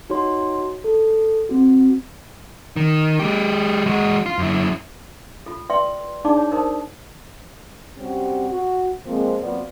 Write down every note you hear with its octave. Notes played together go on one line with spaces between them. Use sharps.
D#4 F#4 C#5 C6
A4
C4 F#4
D#3
G#3 G4
G#3 F#4
F4
F#2 E4
F4 A4
B4 D5 E5 G5 C6
D4 D#4 G#4 D5 A5 D6
C#5 D6
D#4 A#4 C5 A5 D#6
C3 G3 C4 C#4 F#4 G4
F#4
F3 G#3 A#3 C4
A#2 F#3 B3 C4 F4 D5